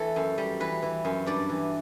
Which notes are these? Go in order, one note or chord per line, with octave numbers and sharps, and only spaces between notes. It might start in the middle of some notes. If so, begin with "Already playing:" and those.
Already playing: E3 A3 A4
F#2
G3
E3 B4
E3
F#2
G2 D5
E3